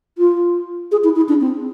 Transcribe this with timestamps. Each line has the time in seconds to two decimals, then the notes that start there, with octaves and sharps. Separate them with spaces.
0.18 F4
0.91 G#4
1.04 E4
1.16 E4
1.29 D4
1.41 C4